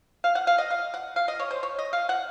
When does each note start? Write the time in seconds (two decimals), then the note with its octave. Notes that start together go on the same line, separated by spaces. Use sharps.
0.24 F5
0.35 F#5
0.47 F5
0.58 D#5
0.71 F5
0.94 F#5
1.16 F5
1.28 D#5
1.39 C#5
1.51 C5
1.63 C#5
1.79 D#5
1.93 F5
2.09 F#5